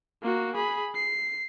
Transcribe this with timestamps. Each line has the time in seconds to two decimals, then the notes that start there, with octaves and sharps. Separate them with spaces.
0.23 A#3 F#4
0.56 G#4 B5
0.95 C7